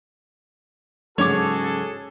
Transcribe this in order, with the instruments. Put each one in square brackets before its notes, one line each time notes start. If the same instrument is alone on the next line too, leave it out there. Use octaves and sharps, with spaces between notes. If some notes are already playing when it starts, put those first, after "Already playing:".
[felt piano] G#2 C#3 F#3 [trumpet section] F#4 G#4 A4 [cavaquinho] C#5 D6